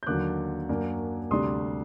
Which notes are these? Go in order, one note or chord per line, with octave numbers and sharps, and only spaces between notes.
G6
D#2 D3 F#3 D6 F#6
F#2 F#3 A#3 D4
D2 C3 G3 D4 C6 D#6